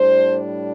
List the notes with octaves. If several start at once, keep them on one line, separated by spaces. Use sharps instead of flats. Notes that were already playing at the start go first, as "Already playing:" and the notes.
Already playing: A2 G3 D4 C5